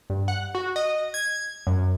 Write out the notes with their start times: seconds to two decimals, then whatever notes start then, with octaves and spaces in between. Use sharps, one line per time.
0.10 G2
0.28 F#5
0.55 F#4
0.76 D#5
1.14 G#6
1.67 F#2